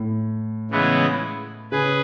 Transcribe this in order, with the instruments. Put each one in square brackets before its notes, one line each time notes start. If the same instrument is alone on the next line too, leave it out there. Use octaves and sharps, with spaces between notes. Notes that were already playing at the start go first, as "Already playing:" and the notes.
Already playing: [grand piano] A2
[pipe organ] C#3 E3 G#3 B3 E4
[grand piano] C#3 [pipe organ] G#4 B4